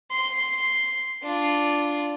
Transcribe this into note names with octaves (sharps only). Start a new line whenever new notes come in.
C6
D4 F4